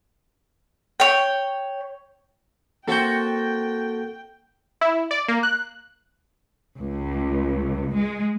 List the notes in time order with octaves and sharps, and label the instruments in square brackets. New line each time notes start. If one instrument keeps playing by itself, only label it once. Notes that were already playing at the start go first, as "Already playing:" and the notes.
[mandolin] C#5 G5
[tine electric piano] A#3 G6 [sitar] C4 F#4 A4 [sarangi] G5
[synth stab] E4
D5
A#3
F#6
[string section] C#2
G#3